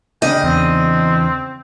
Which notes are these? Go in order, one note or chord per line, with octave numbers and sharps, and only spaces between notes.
C#3 D4 D#5 G5
E2 C4